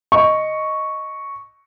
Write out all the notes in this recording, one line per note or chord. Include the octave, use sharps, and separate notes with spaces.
D#5 C#6